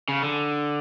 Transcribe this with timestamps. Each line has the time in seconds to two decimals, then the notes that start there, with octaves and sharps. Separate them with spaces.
0.09 C#3
0.22 D3